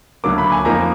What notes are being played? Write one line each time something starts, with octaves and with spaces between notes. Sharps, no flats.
D2 D3 F#3 A#3 D6
B5
G#5
F2 F3 A#3 D#4 A#5